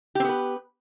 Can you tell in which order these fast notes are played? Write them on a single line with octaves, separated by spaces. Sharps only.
G4 C4 B3 B4